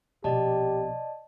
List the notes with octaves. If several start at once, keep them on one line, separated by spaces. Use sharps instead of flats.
A#1 B2 G4 D5 D#5 A5